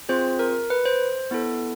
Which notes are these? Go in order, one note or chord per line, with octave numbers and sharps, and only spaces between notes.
C4 F4 G#4 C5
A#4
B4
C5
B3 E4 A4